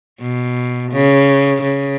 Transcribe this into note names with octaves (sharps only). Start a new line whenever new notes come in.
B2
C#3
C#3